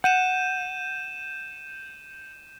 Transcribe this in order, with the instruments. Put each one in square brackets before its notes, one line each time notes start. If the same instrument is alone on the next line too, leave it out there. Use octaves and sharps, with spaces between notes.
[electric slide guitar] F#5 [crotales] G6 D#7 E7